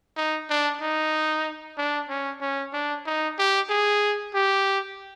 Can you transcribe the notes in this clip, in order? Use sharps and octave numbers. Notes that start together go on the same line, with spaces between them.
D#4
D4
D#4
D4
C#4
C#4
D4
D#4
G4
G#4
G4